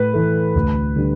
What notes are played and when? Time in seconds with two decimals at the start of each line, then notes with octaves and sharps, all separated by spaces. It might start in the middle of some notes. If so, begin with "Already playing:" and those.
Already playing: A2 B4
0.14 E3 A3
0.55 D2
0.96 D3 G3